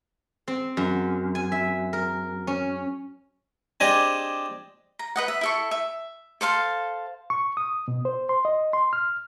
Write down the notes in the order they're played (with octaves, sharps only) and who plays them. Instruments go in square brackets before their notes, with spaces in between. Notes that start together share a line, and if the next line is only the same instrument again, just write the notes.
[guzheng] C4
F#2
G#5
E5
A#4
C#4
[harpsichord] C4 D4 G4 G#4 D#5 G#5
[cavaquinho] A#5
B4 D#5 F#5
E5
E4 A4 C#6
E5
A4 C5 F5 C6
[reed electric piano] C#6
D#6
B2
C5
C6
D#5
C6
F6